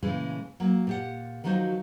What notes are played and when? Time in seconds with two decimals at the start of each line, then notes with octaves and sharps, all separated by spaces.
0.02 A#2 C#3 E3 G#3 A3
0.60 F#3 A#3
0.87 A#2 G4 F#5
1.44 D#3 F3 F#3 D#4 F#4 C5